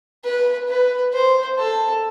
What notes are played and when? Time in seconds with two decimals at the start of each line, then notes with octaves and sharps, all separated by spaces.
0.24 B4
0.69 B4
1.13 C5
1.59 A4